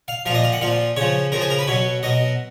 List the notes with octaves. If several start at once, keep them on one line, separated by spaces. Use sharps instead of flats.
F5
A#2 F3 D#5 F5
F5
F#5
A#2 F3 F5
C#3 F3 C#5
C#3 F3 A#4
G#4
A#4
B4
B2 F#3 C#5
B2 F#3 D#5